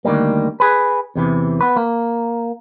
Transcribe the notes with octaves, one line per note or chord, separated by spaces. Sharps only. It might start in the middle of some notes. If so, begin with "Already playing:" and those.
D2 D#3 E3 G3 A#3
G#4 B4
E2 C3 E3
B3 B4
A#3